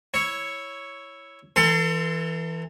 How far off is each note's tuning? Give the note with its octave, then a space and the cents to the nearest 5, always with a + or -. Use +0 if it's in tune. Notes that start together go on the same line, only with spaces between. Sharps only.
E4 +0 C#5 +0
E3 +0 A4 +35 C6 -15